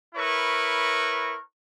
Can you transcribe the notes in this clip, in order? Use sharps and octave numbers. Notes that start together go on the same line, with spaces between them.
E4 A#4 B4 C#5 C#6